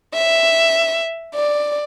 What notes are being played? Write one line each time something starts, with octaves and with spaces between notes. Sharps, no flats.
E5
D5